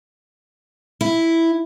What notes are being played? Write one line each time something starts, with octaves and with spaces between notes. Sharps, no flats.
E4